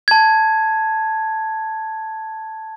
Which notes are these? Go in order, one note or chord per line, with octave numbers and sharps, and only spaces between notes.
A5 G#6